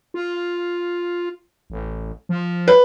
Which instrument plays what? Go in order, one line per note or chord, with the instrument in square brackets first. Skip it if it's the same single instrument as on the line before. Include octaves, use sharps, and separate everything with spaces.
[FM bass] F4
A1
F3
[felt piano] B4